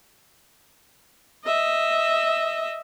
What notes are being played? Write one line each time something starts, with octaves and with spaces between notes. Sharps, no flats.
D#5 E5